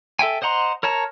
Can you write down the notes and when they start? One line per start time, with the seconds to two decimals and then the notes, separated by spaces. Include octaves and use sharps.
0.19 A4 E5 G5 G#5
0.42 C5 D#5 F#5 A#5 C6
0.83 A#4 C#5 A5 A#5